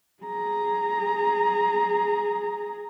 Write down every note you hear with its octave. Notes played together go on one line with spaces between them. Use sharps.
G#4 A#5